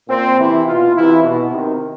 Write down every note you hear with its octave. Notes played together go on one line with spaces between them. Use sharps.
A#2 C4
C3 E3 E4
B2 F4
C3 E3 E4
B2
C3 D#3